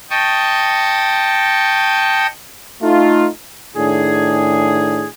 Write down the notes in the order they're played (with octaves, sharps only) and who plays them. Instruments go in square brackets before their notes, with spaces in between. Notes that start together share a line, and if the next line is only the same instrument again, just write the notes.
[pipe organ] D#5 G5 A5 C#6 D#6
[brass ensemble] A3 D#4 F4
[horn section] A2 D#3 D4 G#4